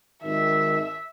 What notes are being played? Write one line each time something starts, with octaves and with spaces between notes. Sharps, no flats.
G#1 D#3 E5